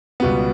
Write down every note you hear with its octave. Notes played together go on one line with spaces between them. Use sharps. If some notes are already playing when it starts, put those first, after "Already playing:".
C#2 B2 G3 B3